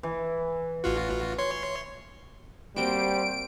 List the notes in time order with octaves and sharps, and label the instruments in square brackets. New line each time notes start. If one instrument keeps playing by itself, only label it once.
[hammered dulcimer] E3
[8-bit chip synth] A1 F4 F#4
C#5 C6
[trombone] G3 [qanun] A#3 C4 F#4 [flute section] C5 [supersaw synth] D7